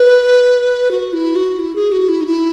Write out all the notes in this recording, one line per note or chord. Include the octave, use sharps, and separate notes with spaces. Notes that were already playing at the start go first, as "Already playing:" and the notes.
Already playing: B4
F#4
E4
F#4
E4
G#4
F#4
E4
D#4
E4